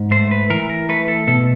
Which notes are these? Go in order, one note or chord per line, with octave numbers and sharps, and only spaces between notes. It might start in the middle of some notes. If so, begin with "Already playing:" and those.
Already playing: G#2
A3 C5
B4
E3 A#4
A#4
A3 B4
A4
B2 A4